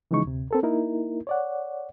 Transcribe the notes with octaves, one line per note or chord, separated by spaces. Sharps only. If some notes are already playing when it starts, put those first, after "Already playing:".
C#3 E3 F3 G#3 D#4 C#6
D2 C3
C4 A4 A#4
A#3 D#4 E4 A#4
C#5 D5 F#5